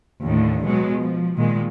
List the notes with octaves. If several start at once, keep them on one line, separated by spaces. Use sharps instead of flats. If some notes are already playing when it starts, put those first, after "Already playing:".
D#2 A2 D3
B2 F#3 G#3
F3
A#2 D#3 G#3